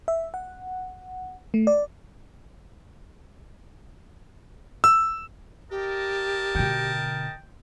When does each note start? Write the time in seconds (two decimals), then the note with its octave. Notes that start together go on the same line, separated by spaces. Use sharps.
0.08 E5
0.34 F#5
1.54 A3
1.67 D5
4.84 E6
5.71 G4 A#4 D#5 A5
6.55 B2 D3 G5 G6 D7